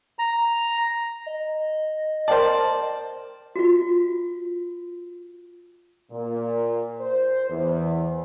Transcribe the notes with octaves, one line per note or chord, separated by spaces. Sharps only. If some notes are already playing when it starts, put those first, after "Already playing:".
A#5
D#5
A#4 C5 D5 G5 A5
F4 F#4
A#2
C5
E2